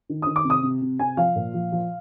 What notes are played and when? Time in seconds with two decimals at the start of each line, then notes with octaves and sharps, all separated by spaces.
0.09 D#3
0.22 D#3 D#6
0.36 D6
0.45 C3
0.50 D#6
0.63 C3
0.82 C3
0.99 C3 G#5
1.17 F3 F5
1.36 A#2
1.54 F3
1.72 F3